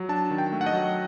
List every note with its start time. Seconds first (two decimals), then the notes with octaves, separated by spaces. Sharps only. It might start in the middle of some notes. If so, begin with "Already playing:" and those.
Already playing: F#3
0.09 D4 A5
0.31 D#3
0.38 G5
0.52 A3
0.61 F#5
0.66 D#5
0.73 F#3